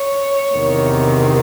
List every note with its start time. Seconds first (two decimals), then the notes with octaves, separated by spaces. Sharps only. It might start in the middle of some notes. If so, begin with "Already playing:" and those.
Already playing: C#5
0.54 E2 C3 D#3